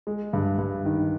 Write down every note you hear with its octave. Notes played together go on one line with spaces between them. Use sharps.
G#3
G2
G2
D#3